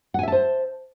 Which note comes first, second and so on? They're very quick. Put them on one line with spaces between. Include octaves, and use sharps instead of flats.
F#5 G#5 E5 A5 C5